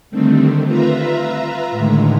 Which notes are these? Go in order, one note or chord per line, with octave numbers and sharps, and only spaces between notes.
D3 D#3 G3 A3 C4
F4 B4 E5 A#5
A2 D3 D#3 G#3